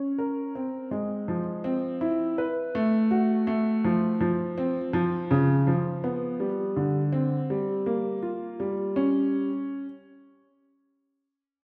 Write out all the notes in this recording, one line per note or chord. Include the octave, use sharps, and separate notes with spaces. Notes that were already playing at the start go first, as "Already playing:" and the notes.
Already playing: C#4
A#4
C4
G#3
F3
C4
E4
B4
A3
F#4
A3
F3
F3
C4
F3
C#3
F3
B3
G3
D3
C4
G3
A#3
F4
G3
C#4